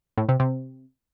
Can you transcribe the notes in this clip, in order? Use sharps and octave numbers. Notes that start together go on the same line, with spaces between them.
A2
C3
C3